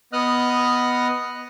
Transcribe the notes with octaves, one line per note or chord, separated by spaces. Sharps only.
B3 D#5 D#6 F6 F#6